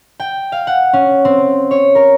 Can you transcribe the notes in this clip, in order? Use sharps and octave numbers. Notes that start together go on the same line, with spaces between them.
G5
F5
F#5
C#4
C4
C#5
A#4